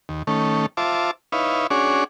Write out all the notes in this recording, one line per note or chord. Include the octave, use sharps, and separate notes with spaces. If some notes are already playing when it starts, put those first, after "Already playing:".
D#2
D#3 A3 C#4
F4 C5 E5 A5 D6
D#4 E4 B4 C#5 F5
C#4 D4 F#4 G#4 C#5 D5